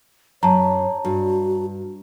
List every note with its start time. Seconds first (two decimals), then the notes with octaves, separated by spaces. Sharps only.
0.43 F#2 C#5 A5 A#5
1.05 G2 F#4